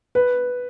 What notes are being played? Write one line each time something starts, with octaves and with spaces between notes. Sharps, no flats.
B4